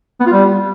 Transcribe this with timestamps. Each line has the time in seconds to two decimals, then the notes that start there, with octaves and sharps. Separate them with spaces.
0.20 B3
0.26 F4
0.33 G3